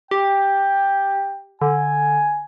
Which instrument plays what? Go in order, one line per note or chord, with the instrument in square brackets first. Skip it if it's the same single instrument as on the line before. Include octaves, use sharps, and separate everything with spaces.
[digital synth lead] G4 [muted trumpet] G5
[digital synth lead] D3 [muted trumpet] G#5